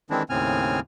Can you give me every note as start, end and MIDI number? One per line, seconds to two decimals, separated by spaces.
0.10 0.23 51
0.10 0.23 52
0.10 0.23 56
0.10 0.23 60
0.10 0.23 62
0.10 0.23 64
0.30 0.80 39
0.30 0.80 45
0.30 0.80 49
0.30 0.80 60
0.30 0.80 80
0.30 0.80 89